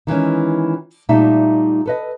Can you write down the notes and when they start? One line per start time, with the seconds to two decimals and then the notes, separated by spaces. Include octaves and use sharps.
0.07 D#3 E3 G#3 C#4
1.09 A#2 G3 A3 D#4 E5
1.86 A4 B4 D#5